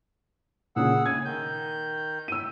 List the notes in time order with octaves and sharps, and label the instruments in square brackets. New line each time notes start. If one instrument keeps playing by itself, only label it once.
[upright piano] A#2 C#3 [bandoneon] G#4 F#5 E6
[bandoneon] A2 G#5 [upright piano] G#6
[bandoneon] D#3 G6
[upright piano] E6 D#7